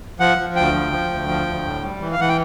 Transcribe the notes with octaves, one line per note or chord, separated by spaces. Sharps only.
F3 F#5
F3
D2 G5
F3
F3
D2
F3
D2
A2
G3
E3
F5
E3 F#5
G5